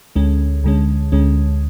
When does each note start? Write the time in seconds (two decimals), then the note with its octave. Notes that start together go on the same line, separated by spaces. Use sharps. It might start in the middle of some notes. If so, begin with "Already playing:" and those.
0.16 D2 D3 G#3 C#4
0.64 D2 D3 G#3 C#4
1.12 D2 D3 G#3 C#4